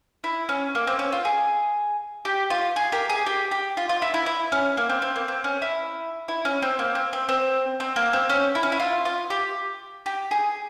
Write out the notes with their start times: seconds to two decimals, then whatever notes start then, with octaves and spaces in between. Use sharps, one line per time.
0.24 E4
0.49 C#4
0.75 A#3
0.87 C4
0.99 C#4
1.12 F4
1.25 G#4
2.25 G4
2.50 F4
2.76 G#4
2.92 G4 A#4
3.10 G#4
3.26 G4
3.51 G4
3.77 F4
3.89 F4
4.02 E4
4.14 E4
4.26 E4
4.52 C#4
4.77 A#3
4.89 C4
5.02 C4
5.16 A#3
5.28 C4
5.44 C#4
5.62 E4
6.28 E4
6.45 C#4
6.62 C4
6.79 A#3
6.95 C4
7.13 C4
7.29 C4
7.80 C4
7.96 A#3
8.13 C4
8.29 C#4
8.55 E4
8.63 C#4
8.72 E4
8.80 F4
9.05 F4
9.30 G4
10.06 G4
10.31 G#4